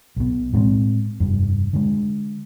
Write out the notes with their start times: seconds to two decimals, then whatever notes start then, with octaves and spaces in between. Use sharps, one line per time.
0.16 B1 B2
0.53 A2 G#3 B3 C4
1.20 F1 G2
1.73 D3 G#3